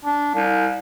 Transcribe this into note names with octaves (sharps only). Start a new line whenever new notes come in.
D4
C2